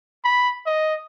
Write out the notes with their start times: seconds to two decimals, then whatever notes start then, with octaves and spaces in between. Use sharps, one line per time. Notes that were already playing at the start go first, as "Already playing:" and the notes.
0.24 B5
0.66 D#5